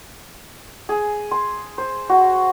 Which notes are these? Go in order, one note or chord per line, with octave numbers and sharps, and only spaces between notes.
G#4
C6
C5
F#4